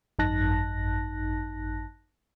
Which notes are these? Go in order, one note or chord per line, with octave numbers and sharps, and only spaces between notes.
G#1 F#2 D#4 A5 F#6 A#6